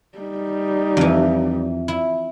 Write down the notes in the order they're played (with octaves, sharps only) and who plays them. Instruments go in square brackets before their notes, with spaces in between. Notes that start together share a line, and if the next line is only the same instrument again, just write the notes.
[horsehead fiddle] G3 D#4
[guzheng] F2 E3
E4